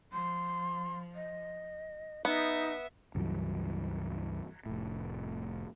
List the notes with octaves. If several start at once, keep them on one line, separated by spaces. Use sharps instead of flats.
F3 C6
D#5
B3 D#4 E5
C#2 G2 E3 F#3
F1 A2